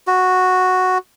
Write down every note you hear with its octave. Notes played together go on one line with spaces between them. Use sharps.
F#4